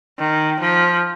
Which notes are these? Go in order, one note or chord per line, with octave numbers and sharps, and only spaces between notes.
D#3
F3